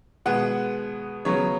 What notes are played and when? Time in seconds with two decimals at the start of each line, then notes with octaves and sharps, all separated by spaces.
0.26 B2 G#3 B3 F#5
1.25 C#3 F#3 B3 C#5